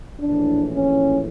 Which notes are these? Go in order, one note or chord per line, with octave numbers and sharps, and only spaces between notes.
A#1 A2 E3 D4
C#4